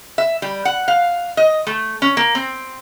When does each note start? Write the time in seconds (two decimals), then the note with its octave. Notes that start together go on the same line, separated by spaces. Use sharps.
0.18 E5
0.42 G3
0.65 F#5
0.88 F5
1.37 D#5
1.67 A3
2.02 C#4
2.17 A#3
2.35 C4